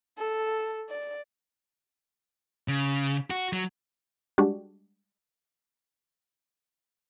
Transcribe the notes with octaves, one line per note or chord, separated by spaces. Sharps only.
A4
D5
C#3
F#4
F#3
G3 G#3 D4 F#4 G4